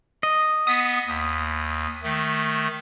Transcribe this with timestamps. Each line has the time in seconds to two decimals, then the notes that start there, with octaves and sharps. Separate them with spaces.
0.23 D#5
0.67 B3 D#6 B6
1.06 D#2
2.03 D#3 A3